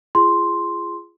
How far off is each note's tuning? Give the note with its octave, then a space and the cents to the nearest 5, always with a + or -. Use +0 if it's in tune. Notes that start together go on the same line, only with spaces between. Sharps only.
F4 -30 G#4 +0 C6 +0